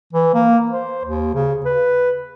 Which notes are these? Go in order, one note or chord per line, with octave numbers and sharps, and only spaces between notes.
E3
A#3
C5
D#2
C#3
B4